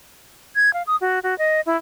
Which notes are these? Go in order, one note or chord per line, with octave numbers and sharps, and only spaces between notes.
G#6
F5
D#6
F#4
F#4
D#5
E4